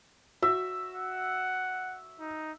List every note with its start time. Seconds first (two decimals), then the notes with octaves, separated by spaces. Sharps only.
0.42 F#4 E5
0.95 F#5
2.20 D#4